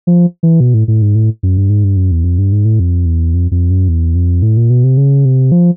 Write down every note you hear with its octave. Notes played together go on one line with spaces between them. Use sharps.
F3
E3
B2
A2
A2
G#2
A2
F#2
G2
G#2
G2
F#2
E2
F2
G2
G#2
A2
F2
E2
F2
F2
F#2
E2
F2
A2
A#2
B2
C3
C#3
C3
F3